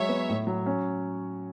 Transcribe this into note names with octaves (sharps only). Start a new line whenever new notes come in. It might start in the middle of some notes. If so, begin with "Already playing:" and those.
Already playing: F#3 G#3 C#5 E5
B3
A2
F#3
C#4